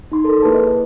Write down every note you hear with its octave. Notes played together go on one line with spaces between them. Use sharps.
D#4 C6
A4 A#4
A#3 E4 G#4 B4 A5
D#5
D#5